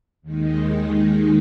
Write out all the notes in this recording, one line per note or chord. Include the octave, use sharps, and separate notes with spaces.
D#2 D#3 G#3 D#4